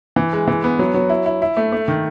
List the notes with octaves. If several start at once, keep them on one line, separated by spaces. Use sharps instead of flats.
E3
G#3
E3
B3
F#3
F#3
E4
E4
E4
A3
A3
D#3